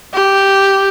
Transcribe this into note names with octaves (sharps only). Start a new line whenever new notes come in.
G4